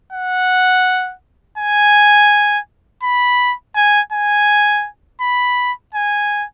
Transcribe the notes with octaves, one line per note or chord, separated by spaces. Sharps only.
F#5
G#5
B5
G#5
G#5
B5
G#5